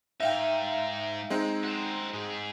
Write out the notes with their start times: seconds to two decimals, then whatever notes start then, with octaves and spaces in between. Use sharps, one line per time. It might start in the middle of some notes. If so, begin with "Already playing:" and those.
0.20 G#2 D#4 E5 F5 G5
1.30 G#3 C4 D#4
1.64 F#4 C5
2.13 G#2 G#4